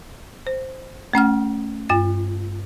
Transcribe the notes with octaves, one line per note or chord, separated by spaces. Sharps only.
C5
A3 C#4 F#5 F6
G2 F4 G5 A6